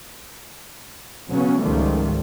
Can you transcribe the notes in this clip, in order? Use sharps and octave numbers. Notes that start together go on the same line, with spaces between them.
C#3 F#3 B3 C#4
C#2 G#2 D#3 F3 G3 A3